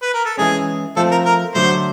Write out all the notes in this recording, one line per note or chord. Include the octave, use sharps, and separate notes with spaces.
B4
A#4
A4
E3 G#3 C#4 G#4
F3 A3 C4 A4
A#4
A#4
D3 F#3 A3 C5